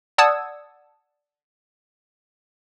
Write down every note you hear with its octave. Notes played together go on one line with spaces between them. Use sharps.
D5 F#5 A5 D#6 E6 G#6